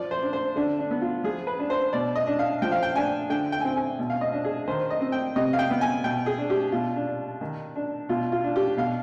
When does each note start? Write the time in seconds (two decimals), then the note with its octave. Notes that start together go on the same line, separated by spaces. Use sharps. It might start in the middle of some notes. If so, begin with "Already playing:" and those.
Already playing: F3 D5
0.11 C5
0.22 D4
0.33 C5
0.55 D3 D4
0.79 D4
0.91 B3
1.01 F4
1.24 F3 G#4
1.47 B4
1.59 D4
1.70 C5
1.93 B2 D5
2.15 D#5
2.27 D4
2.39 F5
2.62 F3 G5
2.72 F5
2.83 G5
2.95 D4 G#5
3.30 D3 G5
3.52 G5
3.60 G#5
3.65 C4 G5
3.76 G#5
3.99 B2
4.10 F5
4.21 D#5
4.32 D4
4.45 G#4
4.68 D#3 C5
4.90 D#5
5.01 C4
5.12 G5
5.36 C3 D#5
5.53 F5
5.59 G5
5.70 B3
5.81 G#5
6.04 B2 G5
6.26 G#4
6.38 D4
6.50 G4
6.72 B2 F4
6.96 D4
7.06 D4
7.41 D#3
7.76 D4
8.09 B2 F4
8.32 F4
8.44 D4
8.56 G4
8.77 B2 F5